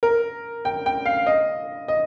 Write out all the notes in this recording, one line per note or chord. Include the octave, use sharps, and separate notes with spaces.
A#4
G5
G5
F5
D#5
D#5